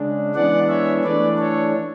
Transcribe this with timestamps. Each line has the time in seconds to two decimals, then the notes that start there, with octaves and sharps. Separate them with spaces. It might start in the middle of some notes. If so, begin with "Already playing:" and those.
Already playing: C#3 G#3 D4
0.35 E3 G#3 B3 D4 D5 F#5
0.69 C#5 E5
1.04 E3 A3 D4 B4 D5
1.38 A4 C#5